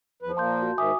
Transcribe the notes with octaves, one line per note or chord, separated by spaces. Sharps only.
E2 F3 B4
A#2 A#3 A5 C6 G6
F#4
G#2 D#3 E5 G#5 D6 D#6